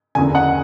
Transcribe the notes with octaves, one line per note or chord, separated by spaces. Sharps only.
F#1 E2 D3 G#5
F#5